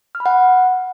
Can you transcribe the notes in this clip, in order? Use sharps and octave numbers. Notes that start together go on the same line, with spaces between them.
F6
B5
F#5